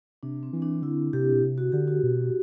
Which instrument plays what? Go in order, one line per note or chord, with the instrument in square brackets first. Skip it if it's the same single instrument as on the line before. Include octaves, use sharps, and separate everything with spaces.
[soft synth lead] C3 [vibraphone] D4
[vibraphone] C4
[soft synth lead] E3
[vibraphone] D4
[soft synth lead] D3 [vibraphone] E4
[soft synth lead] C3 [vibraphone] G4
[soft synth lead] B2
C3
[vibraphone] F#4
[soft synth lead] D3 [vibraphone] G4
[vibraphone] F#4
[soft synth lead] B2